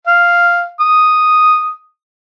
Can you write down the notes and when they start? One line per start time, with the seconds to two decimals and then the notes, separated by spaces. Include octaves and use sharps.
0.07 F5
0.81 D#6